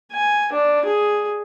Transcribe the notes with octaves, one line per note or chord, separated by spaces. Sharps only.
G#5
D4
G#4